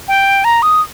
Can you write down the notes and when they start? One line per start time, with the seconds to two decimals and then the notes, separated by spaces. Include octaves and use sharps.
0.08 G5
0.44 A#5
0.62 D#6